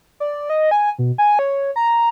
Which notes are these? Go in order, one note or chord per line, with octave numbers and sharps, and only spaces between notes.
D5
D#5
G#5
B2
G#5
C#5
A#5